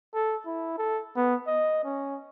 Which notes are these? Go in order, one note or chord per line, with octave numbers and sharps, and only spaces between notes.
A4
E4
A4
B3
D#5
C#4